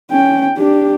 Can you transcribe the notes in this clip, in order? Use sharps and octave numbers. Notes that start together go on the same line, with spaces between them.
C#4 G5
D4 G4